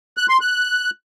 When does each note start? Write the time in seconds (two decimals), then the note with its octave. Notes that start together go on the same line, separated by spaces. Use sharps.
0.17 F#6
0.29 C6
0.41 F#6